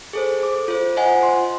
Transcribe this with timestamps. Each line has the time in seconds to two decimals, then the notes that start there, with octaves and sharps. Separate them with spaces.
0.13 G#4 A4 C5
0.43 D6
0.68 F4 C5
0.97 F4 C5 D#5 F#5 G#5
1.23 C6